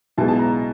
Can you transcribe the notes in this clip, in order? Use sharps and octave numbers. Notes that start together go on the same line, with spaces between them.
B1 B2 G#3 B3 E4 A5
A5
A#5